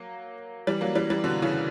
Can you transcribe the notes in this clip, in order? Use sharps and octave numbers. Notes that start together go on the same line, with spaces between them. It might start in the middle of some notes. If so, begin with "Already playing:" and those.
Already playing: F#3 A#3
E3 G3
F#3 A#3
E3 G3
E3 G3
B2 D3
C#3 E3